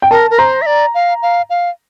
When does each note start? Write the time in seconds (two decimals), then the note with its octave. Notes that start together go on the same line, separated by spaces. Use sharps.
0.02 G5
0.11 A#4 A5
0.31 A#4
0.39 C5 A#5
0.62 E5
0.66 D5
0.94 F5
1.22 F5
1.50 F5